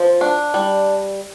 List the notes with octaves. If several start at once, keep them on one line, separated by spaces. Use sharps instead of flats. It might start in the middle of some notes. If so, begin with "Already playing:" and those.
Already playing: F3
D4
G3